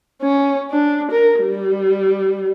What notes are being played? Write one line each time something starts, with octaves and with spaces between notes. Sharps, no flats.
C#4
D4
A#4
G3